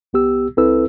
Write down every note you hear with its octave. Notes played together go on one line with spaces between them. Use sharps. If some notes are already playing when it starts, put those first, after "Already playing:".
C2 B3 G4 E6
C2 C4 E4 A4 B4 E6